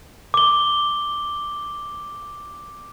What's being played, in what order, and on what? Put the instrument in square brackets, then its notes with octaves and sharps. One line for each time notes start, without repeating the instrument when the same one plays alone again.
[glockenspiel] D6 G7